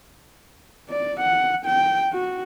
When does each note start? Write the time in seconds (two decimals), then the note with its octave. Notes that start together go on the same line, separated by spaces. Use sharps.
0.89 D5
1.21 F#5
1.66 G5
2.12 F#4